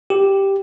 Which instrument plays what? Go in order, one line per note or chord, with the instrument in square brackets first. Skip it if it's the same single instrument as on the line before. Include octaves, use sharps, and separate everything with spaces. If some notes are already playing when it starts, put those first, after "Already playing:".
[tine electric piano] G4